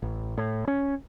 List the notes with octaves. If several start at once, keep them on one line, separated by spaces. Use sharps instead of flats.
A1
A2
C#4